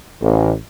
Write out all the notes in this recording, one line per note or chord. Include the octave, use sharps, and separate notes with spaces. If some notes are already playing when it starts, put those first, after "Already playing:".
A1